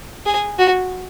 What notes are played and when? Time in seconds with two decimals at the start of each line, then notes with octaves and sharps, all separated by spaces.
0.26 G#4
0.58 F#4